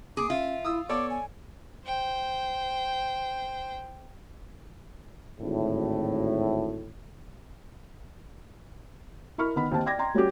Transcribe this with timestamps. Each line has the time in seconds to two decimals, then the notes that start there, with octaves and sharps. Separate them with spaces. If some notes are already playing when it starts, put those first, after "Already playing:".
0.17 A#3 G#4 D6
0.30 C#4 F4 E5
0.65 E4 D#6 E6
0.89 B3 A4 C#5 D5 D6
1.10 G#5
1.85 C5 G5
5.40 G#1 D2 A2
9.38 E4 A#4 B5 C#6 F6
9.56 D#3 B3 B5
9.71 D#2 C4 D#4 A5
9.86 D5 G5 D6 G#6 A#6
9.99 G5 A#5 C6
10.15 G3 C#4 F#4 G4